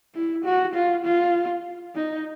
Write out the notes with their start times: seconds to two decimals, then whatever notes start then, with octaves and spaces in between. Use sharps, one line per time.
0.15 E4
0.45 F#4
0.75 F4
1.05 F4
1.95 D#4